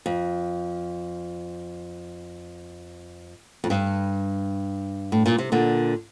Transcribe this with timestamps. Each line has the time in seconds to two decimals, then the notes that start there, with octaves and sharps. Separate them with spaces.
0.06 F2
3.64 F2
3.70 G2
5.12 A2
5.26 A#2
5.38 C3
5.52 A#2 D3